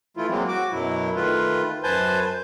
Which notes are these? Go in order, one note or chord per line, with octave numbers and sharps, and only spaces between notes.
E3 A3 E4 F4
F#3 G#3 A#3 C4
F#4 D6
F#2 B2 F#3 E4
D#3 A3 F4 B4
F#2 B4 C5 G#5 A5 G6